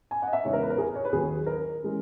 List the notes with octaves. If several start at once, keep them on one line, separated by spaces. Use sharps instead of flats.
G#5
D#5 F#5
E5
E2 C#3 G#3 B3 D#4 C#5
A#4
B4
A#4
G#4
C#5
B4
D#2 D#3 F#3 G#4
A#4
E3 G#3 C#4